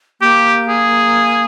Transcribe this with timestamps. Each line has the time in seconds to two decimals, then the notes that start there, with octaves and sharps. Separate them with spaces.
0.21 A#3 G4
0.68 G#4